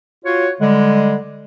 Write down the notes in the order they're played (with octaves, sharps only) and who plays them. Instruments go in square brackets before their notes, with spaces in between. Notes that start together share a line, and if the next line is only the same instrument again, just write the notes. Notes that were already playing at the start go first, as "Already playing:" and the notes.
[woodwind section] F4 F#4 C#5
D3 G3 G#3